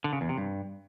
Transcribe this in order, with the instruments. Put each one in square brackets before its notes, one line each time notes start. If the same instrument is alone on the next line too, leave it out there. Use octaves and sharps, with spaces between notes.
[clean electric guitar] D3
C#3
E2
C3
G2